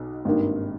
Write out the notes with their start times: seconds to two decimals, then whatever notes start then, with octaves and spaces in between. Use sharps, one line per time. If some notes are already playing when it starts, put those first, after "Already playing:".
Already playing: B1 B2
0.25 G#1 G2 D#3 A#3